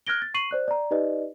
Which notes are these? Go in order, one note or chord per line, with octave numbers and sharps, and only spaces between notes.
F6 F#6 G#6 A#6 D7 G7
A6
C#6 C7 D#7 F#7
C5 D5 F#6
D5 A#5
D#4 G4 B4 D5 D#5